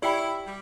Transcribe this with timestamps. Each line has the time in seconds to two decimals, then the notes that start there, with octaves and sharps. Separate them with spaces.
0.02 E4 G4 D5 G5 B5
0.45 G3